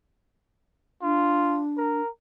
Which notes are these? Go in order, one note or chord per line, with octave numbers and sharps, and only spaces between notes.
D4 F4
A#4